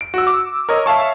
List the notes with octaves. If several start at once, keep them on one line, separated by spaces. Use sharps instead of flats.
D7
F#4 E6
D6
A#4 C#5 D#5
C#5 E5 F5 A5 C#6